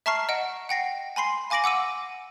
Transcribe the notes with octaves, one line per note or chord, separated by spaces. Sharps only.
E5 A5 A#5 C#6 F6 C7
D#5 F#5 D7
F#5 G5 A#6 C7
G#5 B5 C6 C7
F5 G#5 D6 A#6 D7 F#7
F#5 D6 E6 D#7